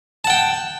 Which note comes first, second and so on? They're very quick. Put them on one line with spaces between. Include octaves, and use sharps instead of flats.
A5 F#5 G5